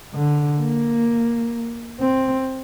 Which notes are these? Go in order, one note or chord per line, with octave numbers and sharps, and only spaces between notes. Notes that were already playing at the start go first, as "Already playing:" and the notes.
D3
A#3
C4